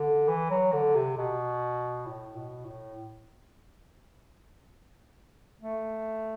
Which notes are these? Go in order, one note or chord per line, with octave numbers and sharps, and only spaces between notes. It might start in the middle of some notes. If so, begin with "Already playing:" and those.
Already playing: D3
E3
F#3
D3
C3
B2
A2
B2
A2
A3